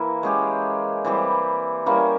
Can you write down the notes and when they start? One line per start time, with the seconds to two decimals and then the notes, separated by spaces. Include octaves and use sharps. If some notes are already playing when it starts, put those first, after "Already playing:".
Already playing: E3 A#3 E4
0.23 G#3 C#4 G4
1.05 E3 G3 C4 G4
1.86 G3 A#3 C#4 E4